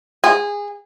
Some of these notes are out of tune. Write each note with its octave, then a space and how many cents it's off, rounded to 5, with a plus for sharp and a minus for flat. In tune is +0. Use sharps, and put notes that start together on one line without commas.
G#4 -20